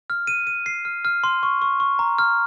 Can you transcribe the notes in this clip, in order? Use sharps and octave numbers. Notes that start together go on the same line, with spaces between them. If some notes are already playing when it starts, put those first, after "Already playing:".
F6
D#7
D#7
C7
F6
F6
C6
C#6
C#6
C#6
A#5
F6